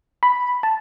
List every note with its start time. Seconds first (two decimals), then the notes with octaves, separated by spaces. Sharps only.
0.23 B5
0.63 A5